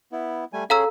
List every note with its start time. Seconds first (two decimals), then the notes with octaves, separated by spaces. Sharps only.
0.12 B3 E4
0.53 G3 A3 G#5
0.70 C#4 G#4 A4 F5 A#5 E6